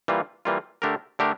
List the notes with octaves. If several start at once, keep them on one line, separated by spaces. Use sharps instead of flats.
E3 G3 A#3 F4
E3 G3 A#3 F4
D3 A3 D4 G4 A#4
D3 A3 D4 G4 A#4